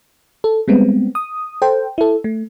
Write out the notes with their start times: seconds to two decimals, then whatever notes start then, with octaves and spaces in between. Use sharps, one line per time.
0.44 A4
0.68 G3 G#3 B3 C4
1.15 D#6
1.62 A4 C5 G5
1.98 E4 A4
2.24 A3